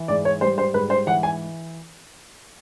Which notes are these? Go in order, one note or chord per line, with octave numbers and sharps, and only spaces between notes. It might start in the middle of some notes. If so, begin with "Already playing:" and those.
Already playing: E3
G#2 D5
C#5
G3 C5
C5
G#2 B4
C5
E3 F#5
G#5